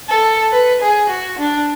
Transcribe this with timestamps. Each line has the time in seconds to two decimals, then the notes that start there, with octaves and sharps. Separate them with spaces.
0.09 A4
0.52 B4
0.81 G#4
1.10 F#4
1.39 D4